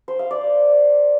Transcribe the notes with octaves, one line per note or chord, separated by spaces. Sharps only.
C5
F5
D5